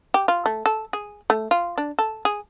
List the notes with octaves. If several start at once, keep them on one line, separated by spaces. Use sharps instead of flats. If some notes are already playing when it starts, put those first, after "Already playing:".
G4
F4
A3
A4
G#4
A3
F4
D4
A4
G#4